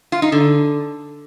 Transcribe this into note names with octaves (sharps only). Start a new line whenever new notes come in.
F4
D#4
D3